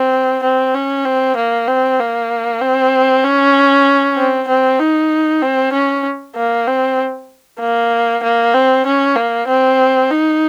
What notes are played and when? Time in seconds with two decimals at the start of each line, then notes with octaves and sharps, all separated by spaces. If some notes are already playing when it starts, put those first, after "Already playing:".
Already playing: C4
0.43 C4
0.74 C#4
1.05 C4
1.36 A#3
1.68 C4
1.99 A#3
2.61 C4
3.24 C#4
4.17 C4
4.48 C4
4.80 D#4
5.42 C4
5.73 C#4
6.36 A#3
6.67 C4
7.60 A#3
8.23 A#3
8.54 C4
8.86 C#4
9.16 A#3
9.48 C4
10.10 D#4